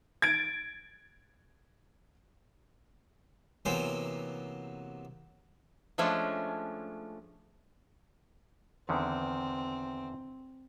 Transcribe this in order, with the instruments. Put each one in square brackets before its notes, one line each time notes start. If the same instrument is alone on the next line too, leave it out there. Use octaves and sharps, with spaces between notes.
[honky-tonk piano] G#6 A6 D7
[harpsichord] C3 E3 F#3 A#3 B3 C5
[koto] F3 G#3 A3 C#4 D4
[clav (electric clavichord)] E2 D3 D#3 [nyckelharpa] C4